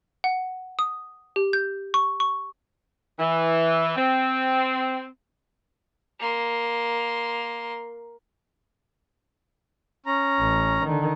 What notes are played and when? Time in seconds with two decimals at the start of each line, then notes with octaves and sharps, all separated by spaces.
0.24 F#5
0.79 D#6
1.36 G4
1.53 G6
1.94 C#6
2.20 C#6
3.19 E3
3.96 C4
6.19 A#3 C6
10.06 C#4 A#5
10.39 A1
10.84 D3 D#3